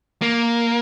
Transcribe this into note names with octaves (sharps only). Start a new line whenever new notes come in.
A#3